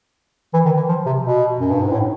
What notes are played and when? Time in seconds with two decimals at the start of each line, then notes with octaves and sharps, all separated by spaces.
0.54 E3
0.66 D#3
0.77 E3
0.89 F3
1.06 C3
1.24 B2
1.60 F#2
1.71 G2
1.82 G#2
1.93 A2